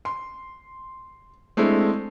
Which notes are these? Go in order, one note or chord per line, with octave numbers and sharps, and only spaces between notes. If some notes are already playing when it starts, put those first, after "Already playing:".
C6
G#3 A3 C4 D4 E4